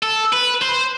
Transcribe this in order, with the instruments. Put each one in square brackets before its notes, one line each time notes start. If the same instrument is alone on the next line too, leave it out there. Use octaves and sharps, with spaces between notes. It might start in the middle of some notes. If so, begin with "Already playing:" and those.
[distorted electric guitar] A4
B4
C5